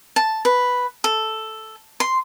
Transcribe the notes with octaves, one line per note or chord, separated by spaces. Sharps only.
A5
B4
A4
C6